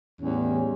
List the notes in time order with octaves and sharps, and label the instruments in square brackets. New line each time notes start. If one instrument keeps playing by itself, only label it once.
[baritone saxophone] E2 [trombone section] A2 G3 C#4